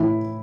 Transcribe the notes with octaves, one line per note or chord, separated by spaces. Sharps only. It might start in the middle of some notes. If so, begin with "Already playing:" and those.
Already playing: A2 E3 E4